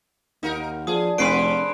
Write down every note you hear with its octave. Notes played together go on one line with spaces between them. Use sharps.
D#2 D#4 A#4 F5 F#5 A#5
F3 D4 G#4 D#6
F1 D3 A#3 C4 B4 C6 C7 D7